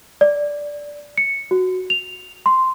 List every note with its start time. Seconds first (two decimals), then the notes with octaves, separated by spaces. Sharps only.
0.21 D5
1.18 C#7
1.51 F#4
1.90 F7
2.46 C6